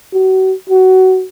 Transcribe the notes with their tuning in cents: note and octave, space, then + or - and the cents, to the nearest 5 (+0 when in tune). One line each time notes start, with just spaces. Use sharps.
F#4 +35
F#4 +20